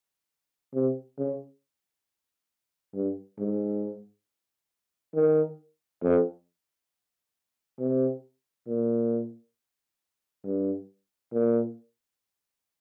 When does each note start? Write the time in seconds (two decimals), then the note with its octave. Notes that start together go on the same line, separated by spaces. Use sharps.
0.74 C3
1.18 C#3
2.94 G2
3.39 G#2
5.15 D#3
6.03 F2
7.79 C3
8.68 A#2
10.44 G2
11.32 A#2